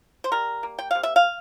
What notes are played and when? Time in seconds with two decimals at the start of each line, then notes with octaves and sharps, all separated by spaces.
0.24 C5
0.32 G3 A#4
0.63 A#3
0.79 G5
0.91 C3 F5
1.03 E5
1.16 F5